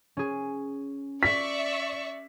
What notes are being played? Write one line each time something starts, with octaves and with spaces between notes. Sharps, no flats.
C#4 G#4
D5 E5 C#6 B6